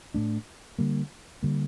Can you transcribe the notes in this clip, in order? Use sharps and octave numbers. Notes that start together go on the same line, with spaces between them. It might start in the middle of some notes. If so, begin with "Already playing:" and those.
A2 A3 D4
D3 G3 A#3
D3 G3 A#3